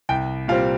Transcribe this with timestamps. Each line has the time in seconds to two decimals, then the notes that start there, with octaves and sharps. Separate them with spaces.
0.09 C2 G5
0.48 A#2 G3 C4 F5